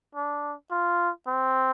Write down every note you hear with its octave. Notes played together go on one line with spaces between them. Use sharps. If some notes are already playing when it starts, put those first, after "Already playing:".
D4
F4
C4